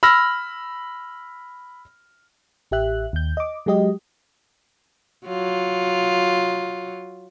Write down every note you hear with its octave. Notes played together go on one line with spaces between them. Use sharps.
B5 E6 F6 A#6
A1 G4 E5 F#6
D#2 G6
D#5 D6
F#3 G#3 G4 D#5
F#3 F4